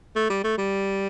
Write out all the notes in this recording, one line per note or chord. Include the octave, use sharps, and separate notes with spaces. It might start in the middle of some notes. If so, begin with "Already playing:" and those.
A3
G3
A3
G3